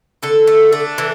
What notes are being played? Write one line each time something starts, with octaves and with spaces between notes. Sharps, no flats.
D3 A4
A3
D4
E3